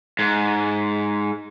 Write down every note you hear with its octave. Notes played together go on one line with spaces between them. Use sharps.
G#2